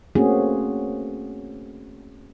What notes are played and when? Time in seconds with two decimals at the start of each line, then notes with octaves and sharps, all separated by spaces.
0.15 A3 A#3 C4 C#4 F#4 G#4